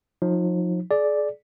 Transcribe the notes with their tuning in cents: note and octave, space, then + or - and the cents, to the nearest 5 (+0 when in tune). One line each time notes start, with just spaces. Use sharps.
F3 +35 D#4 +10
G#4 +35 D5 +0